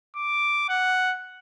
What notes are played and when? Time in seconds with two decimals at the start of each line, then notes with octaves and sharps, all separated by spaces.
0.16 D6
0.69 F#5